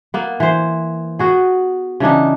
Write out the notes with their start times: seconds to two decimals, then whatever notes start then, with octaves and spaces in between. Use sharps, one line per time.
0.14 A#3 B3
0.40 E3 C5
1.19 B3 F#4 G#4
2.00 C#3 E3 D4 D#4